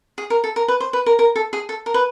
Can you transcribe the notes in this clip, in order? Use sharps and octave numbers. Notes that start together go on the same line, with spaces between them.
G#4
A#4
A4
A#4
B4
C5
B4
A#4
A#4
A4
G#4
A4
A#4
B4